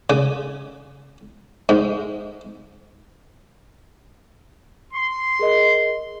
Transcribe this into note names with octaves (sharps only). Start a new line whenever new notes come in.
C#3
G#2
C6
G#4 A#4 D#5